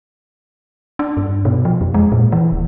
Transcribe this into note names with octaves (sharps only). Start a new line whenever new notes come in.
D4
G2
B2
F3
F2
G#3
A#2
E3
D1